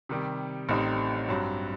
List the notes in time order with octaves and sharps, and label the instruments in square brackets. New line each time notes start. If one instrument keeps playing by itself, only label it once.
[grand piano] C3 D#3 G3
A1 A2 G3 C4 D#4
G2 F#3 C4